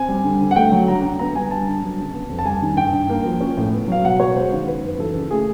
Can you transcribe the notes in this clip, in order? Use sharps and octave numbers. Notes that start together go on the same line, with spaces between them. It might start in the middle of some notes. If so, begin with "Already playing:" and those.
Already playing: C4 G#5
G3
D3
D3
F#5
A3 G5
F#3
D4 A#5
D3
B3 A#5
G3 G#5
D4 A5
D3
F#3
C#3
B3
F2
A5
G3 G#5
D#3
G2 G5
G2
A#3
F3
C#4
A2
B3
F#3 F5
B2 F#5
B2 C#5
G#3 C5
D#3
C#4 B4
F#2
E3 A4
C#3
A3 G#4